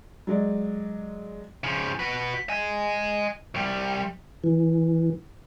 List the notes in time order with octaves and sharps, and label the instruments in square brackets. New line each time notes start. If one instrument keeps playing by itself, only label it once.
[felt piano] F#3 G#3 D5
[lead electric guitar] C#3 F3
F#4 B4
D#5 G#5
C2 G3
[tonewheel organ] E3